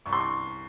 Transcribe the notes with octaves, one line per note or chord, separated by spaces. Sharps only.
C2 C#6
C6
C#6